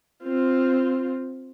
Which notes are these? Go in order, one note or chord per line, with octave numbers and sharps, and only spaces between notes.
C4 F4